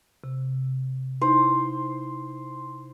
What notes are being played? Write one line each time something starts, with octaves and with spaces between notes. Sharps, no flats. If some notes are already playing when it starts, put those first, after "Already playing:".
C3
D#4 E4 C5